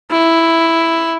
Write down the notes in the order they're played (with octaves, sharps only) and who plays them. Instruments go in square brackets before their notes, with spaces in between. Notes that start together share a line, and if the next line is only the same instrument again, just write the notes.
[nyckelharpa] E4